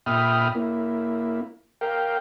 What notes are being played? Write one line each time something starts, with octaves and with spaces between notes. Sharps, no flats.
A#2 E5 G5 B5 D#6 F6
A#3 E4
A#4 F5 G5